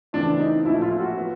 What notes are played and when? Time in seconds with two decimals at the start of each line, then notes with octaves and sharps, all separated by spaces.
0.13 E2 C#3 E3 A3 C4 D4
0.39 D#4
0.65 A#1 A2 F3 A3 E4
0.82 F4
0.99 F#4
1.16 A#2 F#3 B3